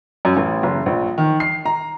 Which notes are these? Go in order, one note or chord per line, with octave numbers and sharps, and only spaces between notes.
F#2
A1
F#1
A#1
D#3
C7
A#5